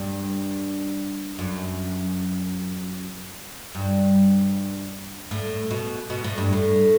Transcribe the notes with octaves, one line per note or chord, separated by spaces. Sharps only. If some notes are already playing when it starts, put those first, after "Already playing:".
Already playing: G2
F#2
G2
A2
B2
B2
A2
G2
A2